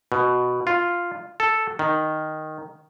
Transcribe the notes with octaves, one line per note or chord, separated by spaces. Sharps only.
B2
F4
A4
D#3